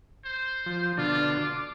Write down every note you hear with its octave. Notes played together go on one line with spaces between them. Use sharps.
C5
F3
B2 D3 D4 F4
D6